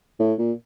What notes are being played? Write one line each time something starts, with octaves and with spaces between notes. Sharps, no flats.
A2
A#2